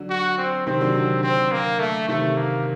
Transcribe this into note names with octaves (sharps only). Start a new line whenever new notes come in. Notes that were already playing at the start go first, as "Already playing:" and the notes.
Already playing: D3 F#3
F#4
C4
C3 D#3 C4
D3 F#3
D3 F#3
C4
A#3
A3
C3 D#3 A3
A#3